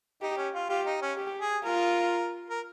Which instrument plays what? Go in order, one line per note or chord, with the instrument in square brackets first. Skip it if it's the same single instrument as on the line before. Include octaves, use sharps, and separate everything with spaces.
[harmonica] D#4 [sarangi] G4
[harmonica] C#4
F4
[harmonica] F4 [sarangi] G4
[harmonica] D#4
C#4
[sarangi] G4
[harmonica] G#4
[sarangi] F4 [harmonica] A#4
[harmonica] A#4